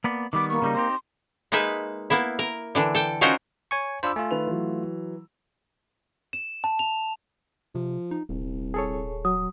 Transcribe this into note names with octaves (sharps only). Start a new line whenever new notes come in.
A#3 B3 D5
D#3 G3 B3 D6
A#3 C#6
C#3 G3 D#4
C4 D#4 G4 C6
G#3 A#3 D#4 B4 E5
A#3 B3 E4
A#4
D3 E3 D4
A4 G5
C#4 D#4 F4 F#4 A#4 C5
C#5 G#5 C#6
D4 F4 C5 B5 D6 E6
A3 F4 G#5
D#3 B4 F7
E3 F#3
E7
A5
F7
C3 F3
D#4
D#1 C2
G#4 A4 C#5
F#3 D#6